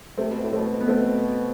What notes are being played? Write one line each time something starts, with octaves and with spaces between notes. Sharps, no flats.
C3 A3 C4
B2
A2
B2 A3 C4
B3
A3 C4